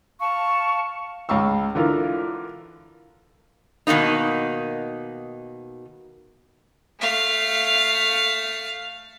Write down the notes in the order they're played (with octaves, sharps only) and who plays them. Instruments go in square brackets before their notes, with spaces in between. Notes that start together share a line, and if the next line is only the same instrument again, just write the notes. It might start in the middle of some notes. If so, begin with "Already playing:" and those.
[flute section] F5 A5 C#6
[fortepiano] C#2 F5 C#6 E6
D3 E3 F4 A#4
[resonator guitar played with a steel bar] B2 D#3 E3 A#3 D#4
[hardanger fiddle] A3 F5